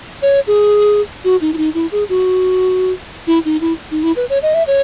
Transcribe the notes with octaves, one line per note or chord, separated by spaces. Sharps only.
C#5
G#4
F#4
D#4
E4
D#4
E4
G#4
F#4
E4
D#4
E4
D#4
E4
B4
C#5
D#5
E5
C#5